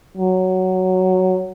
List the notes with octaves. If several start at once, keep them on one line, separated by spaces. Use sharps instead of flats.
F#3